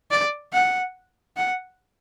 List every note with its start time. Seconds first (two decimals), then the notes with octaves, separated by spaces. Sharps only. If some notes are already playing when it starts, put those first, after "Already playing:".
0.11 D5
0.52 F#5
1.36 F#5